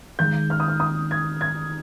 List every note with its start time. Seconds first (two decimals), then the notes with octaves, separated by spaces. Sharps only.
0.19 D#3 G#3 G6
0.50 F6
0.60 D#6
0.68 F6
0.80 D#6
1.11 G#6
1.41 G#6